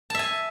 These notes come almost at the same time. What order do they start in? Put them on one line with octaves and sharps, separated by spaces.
A5 E5 G#5